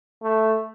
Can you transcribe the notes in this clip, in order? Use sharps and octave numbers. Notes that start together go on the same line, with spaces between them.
A3